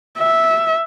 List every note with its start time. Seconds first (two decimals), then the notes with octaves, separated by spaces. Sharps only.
0.19 E5